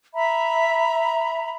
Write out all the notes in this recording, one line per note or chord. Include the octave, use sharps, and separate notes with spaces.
E5 A#5 B5